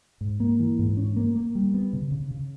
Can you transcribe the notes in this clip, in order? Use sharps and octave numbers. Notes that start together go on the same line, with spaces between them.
G#2
A#3
E3
G#2
C#4
A#3
A#3
G3
B3
C#3
C#3
C#3